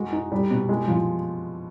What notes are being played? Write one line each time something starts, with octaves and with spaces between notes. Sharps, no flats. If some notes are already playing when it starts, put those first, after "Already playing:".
Already playing: G#3 F#4
D#4
G3
B2
G#3
F3